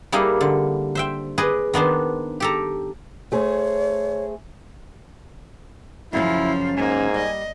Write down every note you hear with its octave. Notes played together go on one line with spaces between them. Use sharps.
G3 A#3 D#4 E4 G#4
D3
C5 E5 G5
G#4 B4 D5 D#5 G#5
D#3 B3 D4 C5
G4 A4 A#5
A3 G#4 C5 C#5
F#2 C#3 F3 C#4 E4 F5
G#2 A#3 G#5
G3 D#5